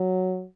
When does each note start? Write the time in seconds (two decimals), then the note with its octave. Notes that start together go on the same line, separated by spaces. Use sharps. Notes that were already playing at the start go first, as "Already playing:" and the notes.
Already playing: F#3